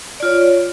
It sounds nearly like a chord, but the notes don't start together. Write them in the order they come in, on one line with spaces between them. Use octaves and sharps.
D5 F4 C#5